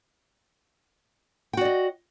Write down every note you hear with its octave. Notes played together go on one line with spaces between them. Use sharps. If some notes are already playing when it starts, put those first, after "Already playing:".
F#4 D5 D#5 G5